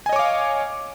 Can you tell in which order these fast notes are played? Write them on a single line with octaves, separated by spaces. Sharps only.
G#5 D#5 C#5 D6 F5